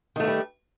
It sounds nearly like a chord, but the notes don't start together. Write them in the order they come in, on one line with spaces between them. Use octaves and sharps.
D#3 A3 A#3 G3